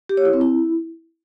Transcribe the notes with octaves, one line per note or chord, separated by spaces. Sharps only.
G4
C#5
E4
C4
E4